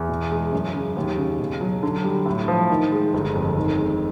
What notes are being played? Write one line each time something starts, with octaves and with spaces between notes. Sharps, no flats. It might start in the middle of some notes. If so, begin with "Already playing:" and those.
Already playing: E2
B2
G#3
F#2
C#3
D#2
C#3
B2
F#3
D3
G3
A2
F3
D#3
G#3
G1
F2
D#3
G#3